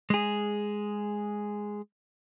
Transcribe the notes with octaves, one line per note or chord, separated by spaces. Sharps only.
G#3 G#4